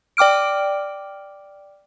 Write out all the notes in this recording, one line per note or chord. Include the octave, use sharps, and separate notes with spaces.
D5 G5 D6 F6 D7